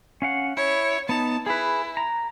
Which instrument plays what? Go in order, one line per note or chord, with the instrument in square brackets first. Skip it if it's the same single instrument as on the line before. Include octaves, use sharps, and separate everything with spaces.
[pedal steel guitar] C#4 F5 F#5
[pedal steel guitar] E4 [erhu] C#5
[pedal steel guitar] B3 D#4 [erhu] A5
[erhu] E4 [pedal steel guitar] G#4 B4
[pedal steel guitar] A#5